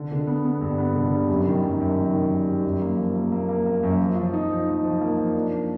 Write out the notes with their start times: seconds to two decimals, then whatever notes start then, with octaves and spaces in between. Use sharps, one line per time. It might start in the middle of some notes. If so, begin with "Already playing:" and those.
Already playing: D3
0.12 D3
0.27 B3
0.45 B3
0.61 G2
0.78 B3
0.95 D3
1.13 G3
1.29 F#2
1.47 D#3
1.63 F#2
1.80 F#2
1.97 D#3
2.13 D#3
2.31 G3
2.48 G3
2.64 F#2
2.81 A#3
2.98 F3
3.16 A#3
3.32 A#3
3.49 A#3
3.66 A#3
3.83 F#2
4.00 F3
4.16 F3
4.33 D#4
4.50 F3
4.67 D#4
4.84 F3
5.01 A#3
5.17 F3
5.35 D4
5.51 A#3